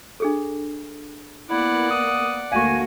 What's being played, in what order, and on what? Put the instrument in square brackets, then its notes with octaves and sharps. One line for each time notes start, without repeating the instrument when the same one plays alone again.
[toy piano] D4 G#4 A4
[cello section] A#3 B3 [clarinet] E4 [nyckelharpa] D5 F#5
[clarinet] D#6
[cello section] D2 A#3 F#4 [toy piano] F5 C#6 [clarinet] G#5